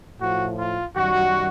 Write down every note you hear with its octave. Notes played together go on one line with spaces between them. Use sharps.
A2 F3 F#4
F4
F#2 D#3 G3 F#4